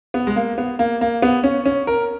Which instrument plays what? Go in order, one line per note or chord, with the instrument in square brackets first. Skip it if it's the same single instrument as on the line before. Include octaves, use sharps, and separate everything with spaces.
[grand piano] B3
G#3
A#3
B3
A#3
A#3
B3
C#4
C#4
A#4